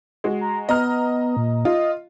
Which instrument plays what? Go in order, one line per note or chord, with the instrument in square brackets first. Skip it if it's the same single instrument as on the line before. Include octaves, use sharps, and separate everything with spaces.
[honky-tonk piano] G#3 F#4
[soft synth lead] A#5
[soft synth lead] B3 [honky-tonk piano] D#5 A#5 F6
[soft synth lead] A#2
[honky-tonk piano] F4 [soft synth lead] D#5